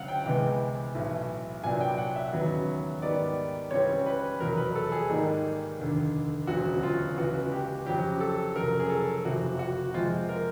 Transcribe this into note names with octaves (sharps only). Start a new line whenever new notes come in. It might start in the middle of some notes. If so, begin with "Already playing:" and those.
Already playing: D2 C#3 F#3 F5 F#5
G5
C2 C3 E3 G#3 B3
B1 A2 E3
C2 A#2 F#3 B3 D4 G#5
G5
F#5
E5
E1 D#2 C#3 F#3 B3
G#2 D#3 G3 B3 D5
C#2 C#3 E3 G3 C4 C#5
B4
F1 E2 B2 F#3 A#4
B4
A4
G#4
G#2 D#3 G3 A#3 D#4
F1 D#2 D3
E1 D2 C#3 F#3 F#4
F4
C#2 C#3 E3 F#4
G4
F2 C#3 F#3 G4
A4
F1 F2 C#3 F#3 A#4
G#4
A4
F#1 F2 C3 F#4
F#4
F2 C3 F3 G#3 C4 F4
A#4